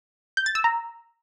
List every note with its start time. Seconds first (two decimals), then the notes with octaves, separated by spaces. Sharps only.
0.37 G6
0.46 A6
0.55 E6
0.64 A#5